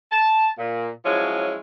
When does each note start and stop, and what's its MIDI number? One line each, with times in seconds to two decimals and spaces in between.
0.11 0.48 81
0.58 0.90 46
1.05 1.57 53
1.05 1.57 54
1.05 1.57 56
1.05 1.57 61
1.05 1.57 64